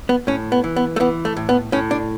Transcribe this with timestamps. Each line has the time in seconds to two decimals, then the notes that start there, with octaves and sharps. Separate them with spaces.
0.09 B3
0.27 A2 C#4
0.52 B3
0.64 E3
0.76 B3
0.96 A3
1.00 E3 B3
1.25 A3
1.37 A2
1.49 B3
1.72 A2 C#4
1.91 D4